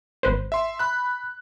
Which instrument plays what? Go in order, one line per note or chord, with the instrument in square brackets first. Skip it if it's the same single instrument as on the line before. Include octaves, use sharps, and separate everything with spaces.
[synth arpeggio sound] G#1 B4 C5
[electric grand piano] E5 C6
B5 F#6